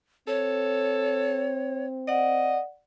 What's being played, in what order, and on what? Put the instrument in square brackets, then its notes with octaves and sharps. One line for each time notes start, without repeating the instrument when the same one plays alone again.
[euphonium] C4 [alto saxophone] A4 [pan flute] C#5
[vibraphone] D5 F#5 [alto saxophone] D#5